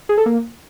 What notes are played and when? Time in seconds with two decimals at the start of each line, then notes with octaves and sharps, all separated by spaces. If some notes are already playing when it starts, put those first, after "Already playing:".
0.09 G#4
0.18 A4
0.26 A#3